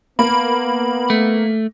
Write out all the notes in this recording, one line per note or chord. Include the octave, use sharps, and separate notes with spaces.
A#3 B3 B5
A3